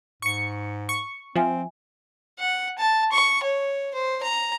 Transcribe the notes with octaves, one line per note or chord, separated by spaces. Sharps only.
G#2 C#6 C#7
C#6
F3 C4 E5 G#5
F#5
A5
C#6
C#5
C5
A#5